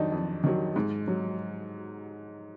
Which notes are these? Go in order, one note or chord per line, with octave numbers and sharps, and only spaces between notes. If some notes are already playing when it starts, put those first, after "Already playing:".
Already playing: F2 D#3 F#3 D4 D#4
F2
D#3 F#3
G#2
F#3